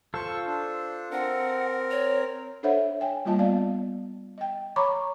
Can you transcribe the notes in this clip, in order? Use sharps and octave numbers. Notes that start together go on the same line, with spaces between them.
F4 A4 C5 C#6
D4
C4 A#4 F#5
C#5
D4 A4 C5 C#5 E5 F#5
C#5 G5 G#5
G3 A#3 F4 D#5 A5
B3 D5 F5
D#5 G5
C#5 A#5 B5 C#6 D6